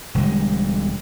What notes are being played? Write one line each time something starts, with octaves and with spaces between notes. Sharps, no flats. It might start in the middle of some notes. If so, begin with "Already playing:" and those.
E1 D3 G3 G#3